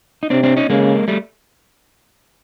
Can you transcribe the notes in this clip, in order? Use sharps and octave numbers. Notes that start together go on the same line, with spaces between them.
D#4
C3 C4 D4
C4 D4
C#4 D#4
C#3 G#3 A#3
G3 A3